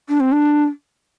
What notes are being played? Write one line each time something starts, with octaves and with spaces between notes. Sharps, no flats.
D4
C4
D4